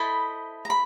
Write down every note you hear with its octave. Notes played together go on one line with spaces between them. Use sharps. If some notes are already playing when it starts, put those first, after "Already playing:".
Already playing: E4 A4 C5 D#5 B5
A#5
B5